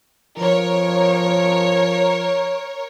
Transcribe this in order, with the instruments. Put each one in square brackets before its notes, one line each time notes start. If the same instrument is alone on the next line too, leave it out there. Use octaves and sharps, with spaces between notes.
[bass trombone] F3 [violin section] A#4 C#5